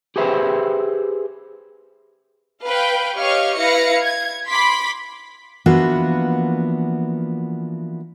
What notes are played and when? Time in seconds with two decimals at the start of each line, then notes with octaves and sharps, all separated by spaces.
0.16 G4 G#4 B4 C5 E5
2.65 B4 F5 G5 B5
3.18 G4 C#5 D#5 F5 C#6 F6
3.59 E4 B4 F5 A#6 C#7
4.01 G#6
4.48 B5 C6 D6 B6
5.66 E3 F3 A#3 B3 D4 F#4